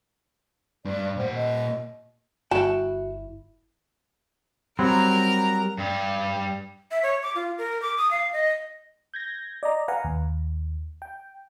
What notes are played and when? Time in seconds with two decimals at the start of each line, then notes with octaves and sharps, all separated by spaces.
0.85 G2 D5
1.18 A#2 C5 F#5
1.35 D#5
2.51 G1 E4 F#4 G5 A5
4.79 F#3 G3 C4 A#4 A#5
5.78 G2 G3
6.91 E5
7.03 C#5
7.23 D6
7.35 F4
7.58 A#4
7.82 D6
7.98 D#6
8.11 F5
8.33 D#5
9.14 G6 G#6 A#6
9.63 D5 D#5 A#5
9.88 B4 F5 F#5 G#5 A#5
10.04 D#2
11.02 G5